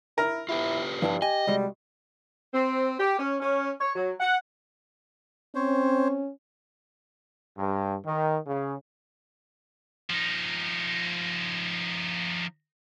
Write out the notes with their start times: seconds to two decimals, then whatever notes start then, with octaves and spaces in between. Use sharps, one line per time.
0.18 E4 A#4
0.49 E4 F4 G4 B4
1.02 G2 F3 E4 A5
1.22 G4 D#5 G#5
1.47 C2 G3 G#3 F#4
2.54 C4
2.98 G4
3.18 C#4
3.40 C#4
3.80 C#5
3.95 F#3
4.20 F#5
5.55 C4 C#4 C5 C#5
7.58 G2
8.05 D#3
8.47 C#3
10.10 F3 D#4